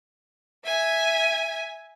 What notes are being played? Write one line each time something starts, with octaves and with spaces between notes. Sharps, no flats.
E5 G#5